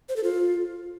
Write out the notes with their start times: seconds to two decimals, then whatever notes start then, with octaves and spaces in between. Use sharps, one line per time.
0.09 C5
0.16 A4
0.24 F4